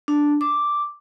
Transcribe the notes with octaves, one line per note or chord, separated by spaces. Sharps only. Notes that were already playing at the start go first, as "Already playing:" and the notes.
D4
D6